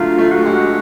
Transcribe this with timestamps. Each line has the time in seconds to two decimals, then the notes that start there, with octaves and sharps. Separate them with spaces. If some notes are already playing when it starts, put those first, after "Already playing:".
Already playing: A#2 D3 F#3 A3 F4
0.18 A3
0.31 F#4
0.43 G#3 G4
0.54 F#4